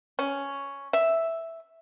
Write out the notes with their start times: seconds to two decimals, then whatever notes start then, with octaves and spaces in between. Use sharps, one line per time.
0.19 C#4
0.93 E5